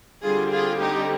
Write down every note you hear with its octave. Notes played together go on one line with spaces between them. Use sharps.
D3 G3 C4 F4 G#4
F4 G#4
D#4 G4